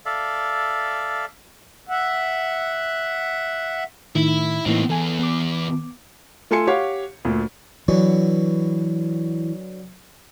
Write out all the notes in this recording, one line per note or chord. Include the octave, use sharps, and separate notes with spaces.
A4 D5 E5 F5
E5 F#5
A2 D#3 E4
A2 E3 A#3 C4 D#4
E2 A4 G#5
B3 D6
A3 F4 A4 G#5 C6 C#7
G4 C#5 F5 F#5
D2 A#2
D3 E3 F#3 B3